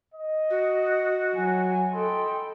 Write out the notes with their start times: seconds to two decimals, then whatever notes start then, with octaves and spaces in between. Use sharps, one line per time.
0.14 D#5
0.50 F#4
1.35 F#3 G#5
1.94 A4 D#5 G5 B5 C6